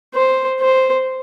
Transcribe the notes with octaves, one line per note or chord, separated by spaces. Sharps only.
C5
C5